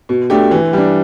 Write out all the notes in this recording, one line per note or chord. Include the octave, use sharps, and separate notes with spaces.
B2
A3 D4 G4
E3
G3 D4